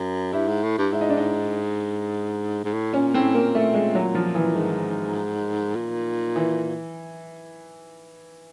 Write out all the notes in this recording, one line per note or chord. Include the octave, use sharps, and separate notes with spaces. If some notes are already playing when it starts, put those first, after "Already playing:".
Already playing: F#2
G2 E4
G#2
A2
G2
G#2 E4
D#4
D4
D#4
G#2
A2
A#2 C#4
A2 C4
A#2 A#3
A3
G#3
F#3
F3
E3
G#2 D#3
A#2
E3